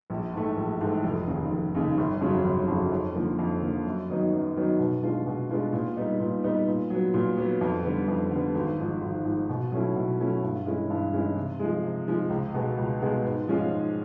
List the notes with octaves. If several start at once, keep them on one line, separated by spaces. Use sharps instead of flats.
A#1
G#2 E3 A3
A#1
G#2 E3 A3
F1
D#2 C#3
F1
D#2 C#3
G1
F2 C#3 F#3
G1
F2 C#3 F#3
F2
D3 F3 A#3
F2
D3 F3 A#3
F#2
D#3 F#3 B3 D#4
F#2
D#3 F#3 B3 D#4
B2
G#3 B3 D4 F4
B2
G#3 B3 D4 F4
A#2
G3 B3 D#4
A#2
G3 B3 D#4
A#2
F#3 B3
A#2
F#3 B3
F2
D3 G3 B3
F2
D3 G3 B3
G#1
G#2 F3
G#1
G#2 F3
B2
F#3 A3 C#4 E4
B2
F#3 A3 C#4 E4
G2
E3 G#3 C#4 E4
G2
E3 G#3 C#4 E4
C3
F3 G#3
C3
F3 G#3
C#2
B2 G#3 B3
C#2
B2 G#3 B3
G#2
F3 G#3 C#4 F4
G#2